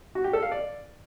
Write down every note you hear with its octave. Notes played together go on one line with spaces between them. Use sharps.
F#4
G4
A4
F5
D5